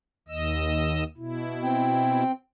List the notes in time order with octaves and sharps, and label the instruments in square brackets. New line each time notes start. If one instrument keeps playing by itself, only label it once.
[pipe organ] D#2 D#5 E6
B2 E4
[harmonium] C4 G5